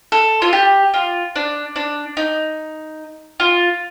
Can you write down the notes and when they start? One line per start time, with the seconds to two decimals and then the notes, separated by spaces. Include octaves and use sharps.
0.12 A4
0.42 F4
0.53 G4
0.94 F4
1.36 D4
1.76 D4
2.17 D#4
3.40 F4